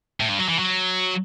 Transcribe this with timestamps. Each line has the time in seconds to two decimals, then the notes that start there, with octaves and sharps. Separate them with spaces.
0.20 A2
0.29 G2
0.39 F#3
0.49 E3
0.59 F#3